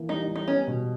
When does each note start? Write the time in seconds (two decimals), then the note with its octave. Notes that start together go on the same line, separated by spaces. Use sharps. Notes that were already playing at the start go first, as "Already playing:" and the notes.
Already playing: E3 A#3
0.09 G3 D#4
0.28 G3
0.36 D#4
0.48 B3 C#4
0.67 B2